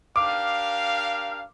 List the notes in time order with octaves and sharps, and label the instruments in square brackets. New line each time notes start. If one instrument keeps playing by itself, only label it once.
[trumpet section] D4 G4 A#4 F5 [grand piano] D6